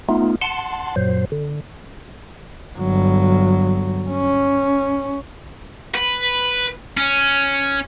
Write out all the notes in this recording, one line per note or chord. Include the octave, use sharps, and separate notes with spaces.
A3 B3 D#4 F4
F#5 A5 C6
F#2 A#2 F#3 C5
D3
G1 F#3
C#4
B4
C#4